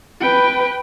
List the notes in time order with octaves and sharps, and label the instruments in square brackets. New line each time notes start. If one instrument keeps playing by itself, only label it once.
[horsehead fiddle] B4 G5